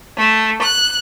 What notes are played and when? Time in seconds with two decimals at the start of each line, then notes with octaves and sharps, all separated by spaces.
0.17 A3
0.61 F#6